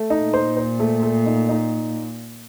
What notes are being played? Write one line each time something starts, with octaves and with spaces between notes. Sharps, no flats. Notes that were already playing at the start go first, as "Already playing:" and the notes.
Already playing: A3
D#4
A#2
C5
C5
A3
A3
D#4
D#4